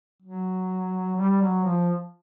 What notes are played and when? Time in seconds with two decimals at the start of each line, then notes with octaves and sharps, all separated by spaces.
0.22 F#3
1.16 G3
1.41 F#3
1.64 F3